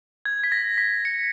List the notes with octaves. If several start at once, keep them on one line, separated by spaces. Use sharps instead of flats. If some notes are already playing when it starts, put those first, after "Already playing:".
G#6
B6
A#6
B6
C#7